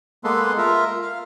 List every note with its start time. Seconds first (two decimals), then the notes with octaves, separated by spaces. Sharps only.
0.24 G#3 A#3 B3 A4 B4 C6
0.58 F4 A#4 E5
1.02 F5